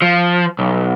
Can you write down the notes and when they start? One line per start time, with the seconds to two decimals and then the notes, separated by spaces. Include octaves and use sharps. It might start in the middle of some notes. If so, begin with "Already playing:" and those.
0.02 F3
0.59 B1